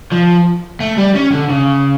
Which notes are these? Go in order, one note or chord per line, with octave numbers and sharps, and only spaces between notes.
F3
A3
G3
C#4
D3
C#3